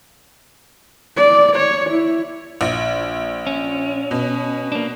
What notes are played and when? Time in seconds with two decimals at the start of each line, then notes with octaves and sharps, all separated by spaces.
1.17 D5
1.56 C#5
1.90 E4
2.61 A#1
3.47 C#4
4.11 B2
4.72 A#3 D4